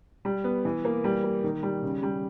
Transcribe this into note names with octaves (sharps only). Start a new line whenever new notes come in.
G3
B3
E3
A#3
G3
A#3
D#3
G3
C#3
G3